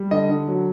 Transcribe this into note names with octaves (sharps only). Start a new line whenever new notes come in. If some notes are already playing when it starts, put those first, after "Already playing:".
Already playing: G3
D3 D#5
D3
F#3